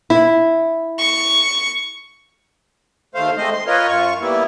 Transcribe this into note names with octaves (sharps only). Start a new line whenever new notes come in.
E4
C#6
D#2 A3 C5 F5
G#3 A3 C4 C5 D#5
C6
F4 A#4 B4 C#5 D#5
F#2 F4 C#6
G3 A#3 B3 E4